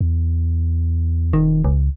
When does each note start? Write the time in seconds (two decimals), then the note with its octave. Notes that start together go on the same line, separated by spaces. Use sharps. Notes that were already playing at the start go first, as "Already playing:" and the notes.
0.01 E2
1.33 E1 D#3
1.64 C#2